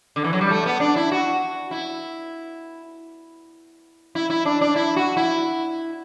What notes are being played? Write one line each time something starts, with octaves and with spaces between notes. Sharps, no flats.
D3
E3
F#3
G3
A3
B3
D4
E4
F#4
E4
E4
E4
D4
D4
E4
F#4
E4